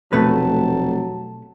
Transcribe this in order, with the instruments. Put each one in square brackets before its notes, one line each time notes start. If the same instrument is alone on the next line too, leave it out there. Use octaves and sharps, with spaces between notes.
[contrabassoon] F1 [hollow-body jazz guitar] B2 A3 B4 [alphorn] F#3 [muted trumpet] A5